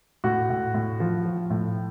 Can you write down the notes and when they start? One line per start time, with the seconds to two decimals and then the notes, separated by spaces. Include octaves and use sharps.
0.24 A2 F#4
0.50 A2
0.74 A2
1.00 F3
1.25 F3
1.50 A2